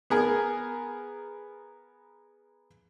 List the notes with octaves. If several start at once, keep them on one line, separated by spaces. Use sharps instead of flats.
B3 G#4 A#4